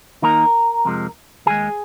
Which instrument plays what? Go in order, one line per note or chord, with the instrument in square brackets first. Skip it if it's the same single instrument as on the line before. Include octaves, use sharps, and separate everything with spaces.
[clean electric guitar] D#2 D#3 A#3 D#4 A#4 A#5
F2 C3 F3 G#3
D#2 D#3 G#3 G#4 G#5